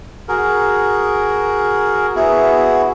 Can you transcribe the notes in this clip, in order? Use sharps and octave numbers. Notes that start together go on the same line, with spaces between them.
F#4 G#4 A#4
B3 E4 F#4 G#4